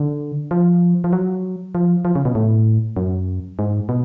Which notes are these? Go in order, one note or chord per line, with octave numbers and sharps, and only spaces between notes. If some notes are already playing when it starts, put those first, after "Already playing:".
Already playing: D3
F3
F3
F#3
F3
F3
C#3
B2
A2
F#2
G#2
B2